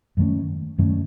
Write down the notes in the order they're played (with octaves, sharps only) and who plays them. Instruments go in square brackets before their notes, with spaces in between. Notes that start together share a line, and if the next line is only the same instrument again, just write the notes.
[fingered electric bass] F#2 D#3 A3 C#4
F#2 D#3 A3 C#4